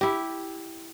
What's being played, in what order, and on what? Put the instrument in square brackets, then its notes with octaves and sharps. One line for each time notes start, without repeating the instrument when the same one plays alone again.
[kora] E4 G4